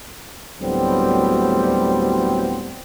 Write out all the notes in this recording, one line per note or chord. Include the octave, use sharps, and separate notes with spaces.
D2 A2 F#3 G3 B3 C4